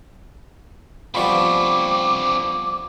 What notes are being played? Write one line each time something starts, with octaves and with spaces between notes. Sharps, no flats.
F3 G3 B3 C4 D4 B5 C#6 D6